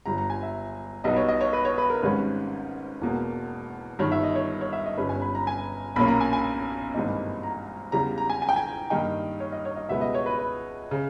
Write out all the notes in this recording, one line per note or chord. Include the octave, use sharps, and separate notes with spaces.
G1 G2 G3 A#5
A#5
G#5
E5
B1 B2 G3 B3 D#4 D#5
C#5
D#5
C#5
B4
C#5
B4
A#4
G#1 G#2 D#3 G3 C#4 B4
E1 E2 B2 A#3
G1 G2 D#3 G3 C#5
E5
D#5
C#5
C#5
E5
D#5
G1 G2 G3 C#4 B4
G#5
B5
A#5
G#5
B1 A#2 A#3 C#4 B5
A#5
G#5
G#5
G#1 G2 E3 A#3 D#4
A#5
E2 C#3 G3 A#5
A#5
G#5
G#5
G5
G#5
G2 D#3 A#3 D#4 G5
C#5
D#5
C#5
D#5
C#2 B2 G3 B3 E5
D#5
C#5
B4
B4
C#3